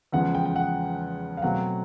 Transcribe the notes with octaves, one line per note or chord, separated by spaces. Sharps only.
E2 C#3 F3 G#3 F#5
G5
G5
F#5
F5
B2 F#3 A3 C4 F#5